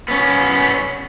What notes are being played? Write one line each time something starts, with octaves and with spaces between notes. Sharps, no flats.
B3 C#4